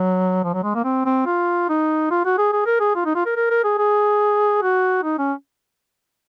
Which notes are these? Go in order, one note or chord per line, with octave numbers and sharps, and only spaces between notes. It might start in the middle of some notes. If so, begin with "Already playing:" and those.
Already playing: F#3
F3
F#3
G#3
A#3
C4
C4
F4
D#4
F4
F#4
G#4
G#4
A#4
G#4
F4
D#4
F4
A#4
A#4
A#4
G#4
G#4
F#4
D#4
C#4